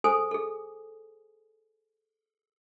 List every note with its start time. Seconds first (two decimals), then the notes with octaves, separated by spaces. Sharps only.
0.04 G#4 A4 C5 G#5 D#6
0.31 G#4 A4